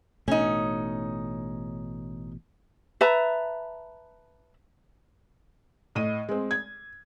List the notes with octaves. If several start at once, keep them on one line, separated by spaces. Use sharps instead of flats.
A1 B2 A3 C#4 D#4
B4 E5 A5 A#5
A2 D#5 D#7
G#3 C4
G#6